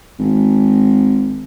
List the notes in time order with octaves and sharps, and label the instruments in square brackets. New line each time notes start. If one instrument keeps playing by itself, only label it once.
[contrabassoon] G#1